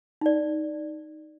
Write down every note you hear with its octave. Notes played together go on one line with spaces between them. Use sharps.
D#4 D5